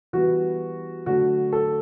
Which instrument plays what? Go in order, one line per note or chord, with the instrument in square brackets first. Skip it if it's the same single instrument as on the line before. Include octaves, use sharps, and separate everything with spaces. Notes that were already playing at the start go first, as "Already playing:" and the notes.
[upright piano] E3 G3 B3 F#4
D3 F#3 A3 F#4
A4